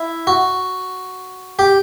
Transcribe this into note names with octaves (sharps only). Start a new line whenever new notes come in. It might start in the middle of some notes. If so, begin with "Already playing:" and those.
Already playing: E4
F#4
G4